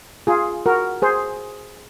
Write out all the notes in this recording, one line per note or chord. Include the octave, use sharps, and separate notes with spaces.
F4 G#4
F#4 A#4
G#4 C5